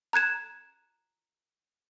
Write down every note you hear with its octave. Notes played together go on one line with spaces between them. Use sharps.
A#5 F#6 G#6 E7